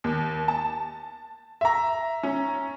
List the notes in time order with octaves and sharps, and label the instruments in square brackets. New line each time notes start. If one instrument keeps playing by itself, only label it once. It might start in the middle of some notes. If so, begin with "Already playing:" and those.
[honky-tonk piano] D#2
A5
[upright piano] E5 A#5
[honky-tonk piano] C#4